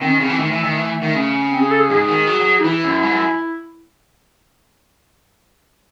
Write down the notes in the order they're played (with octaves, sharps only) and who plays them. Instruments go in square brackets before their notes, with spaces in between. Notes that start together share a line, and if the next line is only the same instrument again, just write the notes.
[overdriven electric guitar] D#3 [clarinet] C4
[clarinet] C#4
[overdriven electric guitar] C#3 [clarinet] C4
[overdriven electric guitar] E3
[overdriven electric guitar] D#3 [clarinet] A3
[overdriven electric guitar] E3
D#3
E3
D#3
C#3
[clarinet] C4
G#4
A4
G#4
[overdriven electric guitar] G#2 [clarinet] G#4
[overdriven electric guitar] D#3
F#3
F#3
[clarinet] D#4
[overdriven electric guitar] E3 [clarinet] E4
[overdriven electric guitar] F#2
G#2
F#2